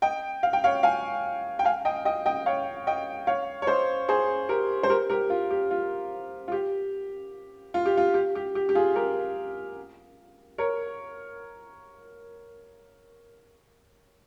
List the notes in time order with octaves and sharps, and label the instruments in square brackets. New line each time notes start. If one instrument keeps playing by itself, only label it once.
[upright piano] D#5 G5
F5
G5
C#5 F5
F5 G#5
G5
F5 G#5
D#5 G5
D#5 G5
D#5 G5
C#5 F5
D#5 G5
C#5 F5
C#5
C5 D#5
G#4 C5
G4 A#4
C5
G4 A#4
G4 A#4
F4
G4
F4
F4
G4
F4
G4
F4
G4
G4
G4
G4
F4 G#4
G4 A#4
A#4 C#5